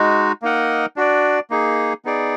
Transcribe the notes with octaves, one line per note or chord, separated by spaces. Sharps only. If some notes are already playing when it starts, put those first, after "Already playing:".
Already playing: G#3 D#4 F#4
A#3 D#4 A#4 D#5 F#5
D4 F#4 D5
A#3 D#4 G#4
B3 D#4 G#4 D5